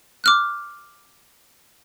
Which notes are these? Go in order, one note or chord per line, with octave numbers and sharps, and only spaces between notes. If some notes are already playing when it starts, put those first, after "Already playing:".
D6 F6 F#6